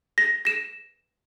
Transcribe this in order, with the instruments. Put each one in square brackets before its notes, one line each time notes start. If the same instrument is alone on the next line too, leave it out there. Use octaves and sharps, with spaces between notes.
[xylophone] A#6
A#6 E7